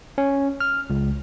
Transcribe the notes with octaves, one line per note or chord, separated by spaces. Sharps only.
C#4
F6
C#2